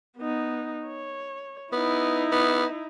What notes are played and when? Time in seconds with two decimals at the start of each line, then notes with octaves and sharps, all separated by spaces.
0.18 B3 D#4
0.86 C#5
1.72 B3 D#4 E4
2.32 B3